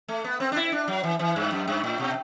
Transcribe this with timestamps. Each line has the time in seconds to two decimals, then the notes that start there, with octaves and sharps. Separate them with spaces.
0.08 A3
0.24 B3
0.40 C4
0.52 D4
0.56 E4
0.72 D4
0.88 F#3
1.03 E3
1.19 E3
1.36 G2
1.52 F#2
1.67 G2
1.84 A2
1.99 B2